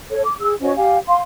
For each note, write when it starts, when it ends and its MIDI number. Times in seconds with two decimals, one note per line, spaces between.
0.11 0.24 69
0.11 0.24 73
0.24 0.35 86
0.41 0.54 68
0.41 0.54 88
0.61 0.73 61
0.61 0.73 66
0.61 0.73 72
0.61 0.73 75
0.76 0.98 67
0.76 0.98 77
0.76 0.98 80
1.07 1.20 77
1.07 1.20 84